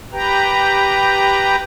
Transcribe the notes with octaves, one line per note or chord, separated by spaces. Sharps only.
G4 B4 G5 A#5